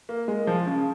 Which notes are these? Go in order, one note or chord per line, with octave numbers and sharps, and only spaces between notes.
A#3
G#3
F3
C#3